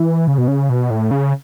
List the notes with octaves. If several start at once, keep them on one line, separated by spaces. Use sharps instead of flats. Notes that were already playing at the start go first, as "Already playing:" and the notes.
Already playing: E3
C#3
B2
C#3
B2
A2
C#3